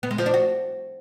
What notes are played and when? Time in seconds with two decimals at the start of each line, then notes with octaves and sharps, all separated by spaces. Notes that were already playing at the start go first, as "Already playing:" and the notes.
0.03 B3
0.11 G#3
0.18 F3
0.26 D4
0.34 F#4